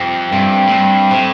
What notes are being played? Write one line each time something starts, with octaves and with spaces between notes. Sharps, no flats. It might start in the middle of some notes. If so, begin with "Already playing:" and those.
Already playing: F2 C3 G3 C4 G4
G2 C3 G3 C4 G4
A2
G2
A2 C3 G3 C4 G4